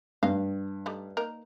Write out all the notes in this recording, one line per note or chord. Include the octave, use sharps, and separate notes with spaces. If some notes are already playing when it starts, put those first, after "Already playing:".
G2 D#5 F5
G3 A3 D#4
A#3 D#4 A#4